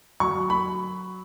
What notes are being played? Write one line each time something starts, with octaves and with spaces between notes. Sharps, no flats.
F#3 C#6
B5